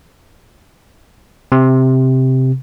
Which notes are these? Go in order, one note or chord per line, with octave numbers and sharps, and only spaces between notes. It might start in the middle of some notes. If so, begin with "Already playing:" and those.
C3